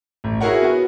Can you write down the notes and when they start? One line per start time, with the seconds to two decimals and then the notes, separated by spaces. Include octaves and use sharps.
0.24 A1
0.41 E4 F#4 G#4 A#4 C#5 F#5
0.62 B3 F#4